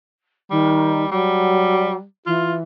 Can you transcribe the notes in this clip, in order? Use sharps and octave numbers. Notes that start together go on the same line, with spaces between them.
D#3 G3
F#3 G3
E3 F4